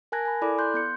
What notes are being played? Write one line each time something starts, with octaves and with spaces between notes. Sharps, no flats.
A#4 G#5 A5 F#6 G#6 A#6
G#5 B5
E4 A4 D5 B5 D6
C6 F#6 G6
B3 G6 C#7